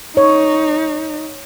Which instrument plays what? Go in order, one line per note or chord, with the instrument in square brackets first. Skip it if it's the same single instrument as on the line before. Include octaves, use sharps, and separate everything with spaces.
[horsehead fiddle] D#4 [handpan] C#5